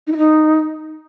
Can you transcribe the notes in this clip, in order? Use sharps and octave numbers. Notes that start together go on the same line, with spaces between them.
D#4
E4
D#4